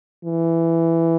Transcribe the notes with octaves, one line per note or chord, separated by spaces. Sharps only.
E3